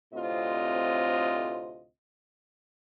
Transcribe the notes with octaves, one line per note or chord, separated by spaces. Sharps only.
D2 A2 C3 C4 F4 D#5